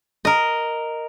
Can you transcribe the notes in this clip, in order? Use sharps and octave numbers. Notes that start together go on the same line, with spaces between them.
A#4 D#5